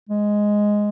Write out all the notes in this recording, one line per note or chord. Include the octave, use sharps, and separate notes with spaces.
G#3